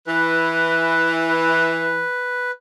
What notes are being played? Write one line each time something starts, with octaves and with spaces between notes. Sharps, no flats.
E3 B4